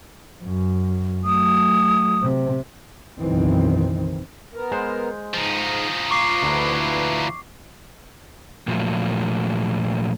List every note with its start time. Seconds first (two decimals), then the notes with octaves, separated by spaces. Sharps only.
0.44 F#2
1.24 F#3 A3 D#6
2.22 C3
3.18 F#1 B1 D#3 E3 C4
4.54 B3 A#4
4.71 G#3 C5
5.34 G#2 F3 D#4
6.11 F4 C#6 D6 C7
6.43 D2 D3 E4 B4
8.68 A#2 F3 F#3 A3